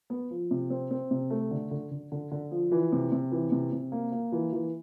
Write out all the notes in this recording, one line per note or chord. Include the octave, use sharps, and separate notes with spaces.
B3
F3
C3
C4
C4
C3
A3
D3
D3
D3
D3
D3
F3
E3
C3
C3
E3
C3
C3
A#3
A#3
E3
E3